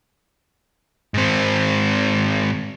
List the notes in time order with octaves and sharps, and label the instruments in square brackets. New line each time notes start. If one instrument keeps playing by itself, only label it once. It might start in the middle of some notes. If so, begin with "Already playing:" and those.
[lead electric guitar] G#2 C4